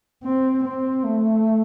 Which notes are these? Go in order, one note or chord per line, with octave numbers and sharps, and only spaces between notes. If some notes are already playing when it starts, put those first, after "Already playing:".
C4
C4
A3